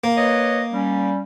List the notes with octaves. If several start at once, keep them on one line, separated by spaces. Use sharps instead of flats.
A#3
B4 C#5 D#5
G3 C#4